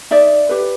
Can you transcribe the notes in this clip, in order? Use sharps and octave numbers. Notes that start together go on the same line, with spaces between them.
D#4 D5 E5
G4 B4